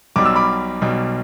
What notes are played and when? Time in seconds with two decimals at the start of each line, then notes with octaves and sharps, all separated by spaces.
0.16 B1 B2 G3 D6
0.25 E6
0.36 B5 D6
0.81 B1 B2 G3